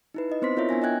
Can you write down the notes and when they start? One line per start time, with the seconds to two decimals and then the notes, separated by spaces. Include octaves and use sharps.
0.14 D#4 E4 B4
0.30 D#4 D#5
0.42 B3 C4 C5 C6 B6
0.57 E4 F4 A#4 C#5 E5
0.69 B3 D4 G#5 A#6
0.82 D#5 G5 G#5 F#6 G#6